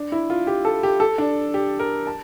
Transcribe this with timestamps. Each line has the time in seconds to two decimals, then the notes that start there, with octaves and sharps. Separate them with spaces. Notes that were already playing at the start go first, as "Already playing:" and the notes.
Already playing: D4
0.12 E4
0.30 F4
0.47 G4
0.65 A4
0.83 G4
1.00 A4
1.18 D4
1.54 G4
1.79 A#4
2.07 A5